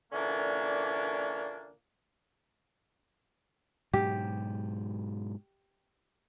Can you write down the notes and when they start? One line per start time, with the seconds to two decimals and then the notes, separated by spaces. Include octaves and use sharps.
0.12 A#2 D3 E3 A#3 C#4 D4
3.93 G#2 B2 F#3 G4